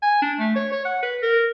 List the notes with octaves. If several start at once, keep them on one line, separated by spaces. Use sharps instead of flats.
G#5
D4
A3
C#5
C#5
F#5
B4
A#4